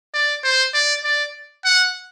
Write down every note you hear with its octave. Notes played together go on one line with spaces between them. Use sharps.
D5
C5
D5
D5
F#5